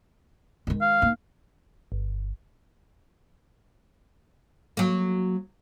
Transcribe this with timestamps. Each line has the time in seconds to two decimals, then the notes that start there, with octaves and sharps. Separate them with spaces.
0.67 D#3 G#3
0.81 F5
1.02 A#3 D#4
1.92 G1
4.77 F#3 A#3